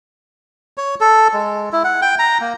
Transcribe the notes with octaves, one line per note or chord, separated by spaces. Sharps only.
C#5
A4
G#3
E4
F#5
G5
A#5
A#3